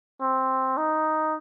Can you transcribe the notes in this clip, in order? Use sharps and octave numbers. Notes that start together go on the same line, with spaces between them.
C4
D#4